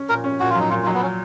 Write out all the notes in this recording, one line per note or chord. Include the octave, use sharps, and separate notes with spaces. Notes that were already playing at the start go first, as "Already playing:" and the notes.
Already playing: C#4
A#2 A#4
C#4
A#2 F#4
F4
F#3 D#4
A#2 F4
F4
F#3 D#4
B3
C#4